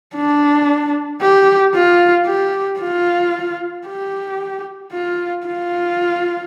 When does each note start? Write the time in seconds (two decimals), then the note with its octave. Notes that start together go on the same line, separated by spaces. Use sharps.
0.15 D4
1.21 G4
1.75 F4
2.27 G4
2.80 F4
3.87 G4
4.93 F4
5.47 F4